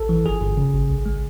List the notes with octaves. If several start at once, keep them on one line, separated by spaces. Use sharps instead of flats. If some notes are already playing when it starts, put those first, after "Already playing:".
Already playing: A1 A4
E3
G1 G#4
G1
C#3
G#1
B1
G#3